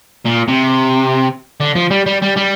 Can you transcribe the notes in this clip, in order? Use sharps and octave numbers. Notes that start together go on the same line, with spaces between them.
A#2
C3
D3
F3
G3
G3
G3
G3